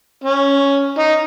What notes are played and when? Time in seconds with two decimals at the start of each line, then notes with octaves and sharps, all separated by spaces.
0.24 C#4
0.99 D#4